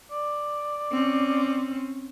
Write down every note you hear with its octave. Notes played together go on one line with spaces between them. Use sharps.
D5
C4 C#4